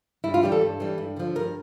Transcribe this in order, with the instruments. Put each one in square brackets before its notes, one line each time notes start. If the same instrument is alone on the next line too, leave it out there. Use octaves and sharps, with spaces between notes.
[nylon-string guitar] G2 E4
F4
E3 G3 G4
A4
G2
E3 G3
G2
D3 F3
G2 A#4